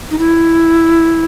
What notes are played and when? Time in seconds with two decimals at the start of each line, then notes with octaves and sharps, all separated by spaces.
0.11 D#4
0.19 E4